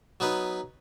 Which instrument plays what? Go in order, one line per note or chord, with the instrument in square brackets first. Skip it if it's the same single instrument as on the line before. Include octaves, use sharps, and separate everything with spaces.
[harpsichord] F#3 B3 D#4 B4